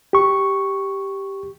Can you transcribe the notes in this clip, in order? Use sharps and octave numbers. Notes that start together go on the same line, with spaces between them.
G4 C#6